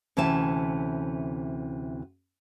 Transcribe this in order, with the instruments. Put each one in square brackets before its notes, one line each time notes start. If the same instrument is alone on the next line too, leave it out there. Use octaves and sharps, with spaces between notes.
[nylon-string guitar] D2 C3 E3 C#4 E5 A5